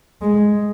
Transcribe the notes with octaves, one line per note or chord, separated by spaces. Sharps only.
G#3